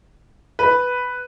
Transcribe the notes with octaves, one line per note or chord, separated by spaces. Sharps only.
B4